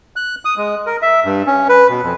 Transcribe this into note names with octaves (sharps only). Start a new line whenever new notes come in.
F#6
D#6
G#3
A#4
E5
G2
C#4
B4
B2
F2